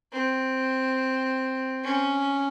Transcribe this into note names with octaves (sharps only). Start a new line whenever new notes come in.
C4
C#4